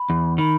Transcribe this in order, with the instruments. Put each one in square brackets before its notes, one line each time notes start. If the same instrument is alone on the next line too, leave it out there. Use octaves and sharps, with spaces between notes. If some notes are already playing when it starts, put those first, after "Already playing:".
Already playing: [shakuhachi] B5
[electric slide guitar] E2
[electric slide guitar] D#3 [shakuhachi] B5